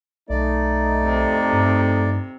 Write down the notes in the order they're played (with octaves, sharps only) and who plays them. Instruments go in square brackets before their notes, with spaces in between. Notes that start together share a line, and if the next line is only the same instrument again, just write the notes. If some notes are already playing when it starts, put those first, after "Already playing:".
[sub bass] B1 [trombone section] A3 D#4 [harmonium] D5
[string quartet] F2 C3
[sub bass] G2